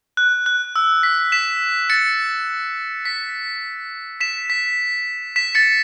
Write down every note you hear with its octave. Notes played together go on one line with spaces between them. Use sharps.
F#6
F#6
E6
B6
B6 E7
A6 C#7
B6
B6 E7
B6
B6 E7
A6 C#7